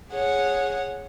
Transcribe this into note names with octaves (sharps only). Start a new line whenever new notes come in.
G#4 C#5 F#5